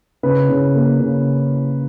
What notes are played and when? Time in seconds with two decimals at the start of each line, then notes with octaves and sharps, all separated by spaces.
0.23 C#3 B4
0.49 C#3
0.75 A#3
1.00 C#3